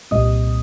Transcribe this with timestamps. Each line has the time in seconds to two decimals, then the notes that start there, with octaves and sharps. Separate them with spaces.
0.11 C2 A#2 G3 C4 D#5 D#6